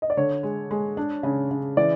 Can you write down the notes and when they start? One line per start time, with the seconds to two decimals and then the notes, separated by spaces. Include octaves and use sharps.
0.02 D#5
0.10 D5
0.17 D3 C#5
0.43 G#3
0.71 G#3
0.97 D4
1.23 C#3
1.51 C#3
1.77 E3 D5